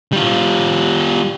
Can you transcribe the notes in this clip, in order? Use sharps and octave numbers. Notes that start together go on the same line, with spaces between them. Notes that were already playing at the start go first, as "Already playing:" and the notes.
G3 F4